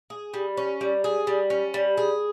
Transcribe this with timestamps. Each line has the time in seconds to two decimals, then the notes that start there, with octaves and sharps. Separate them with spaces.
0.10 G#4
0.34 G3
0.57 C#4
0.81 G3
1.04 G#4
1.27 G3
1.50 C#4
1.74 G3
1.98 G#4